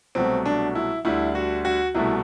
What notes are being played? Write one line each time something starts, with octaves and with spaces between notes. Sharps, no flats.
C2 B2 F#3 A3 C4
D4
E4
D2 D3 G3 E4
F#4
F#4
C2 B2 A3 E4